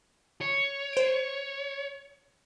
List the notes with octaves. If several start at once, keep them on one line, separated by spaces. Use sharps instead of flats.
C#5
C5 D7